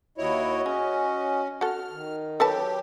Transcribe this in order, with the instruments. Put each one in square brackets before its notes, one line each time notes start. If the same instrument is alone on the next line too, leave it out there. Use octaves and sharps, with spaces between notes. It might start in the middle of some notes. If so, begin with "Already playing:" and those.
[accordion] D#2 E4 C#5 [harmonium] F#4 D#5
[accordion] C#4 [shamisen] G#4
[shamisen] F#4 A4 [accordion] F6
[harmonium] D#3
[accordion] F#3 G4 [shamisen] A4 B4 A5